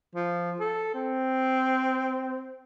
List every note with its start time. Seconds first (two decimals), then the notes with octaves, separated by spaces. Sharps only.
0.16 F3
0.61 A4
0.95 C4